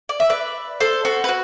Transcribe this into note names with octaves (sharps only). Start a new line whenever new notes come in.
D5
E5
B4 D5
A4 C5
F#4 A4
B4
F#4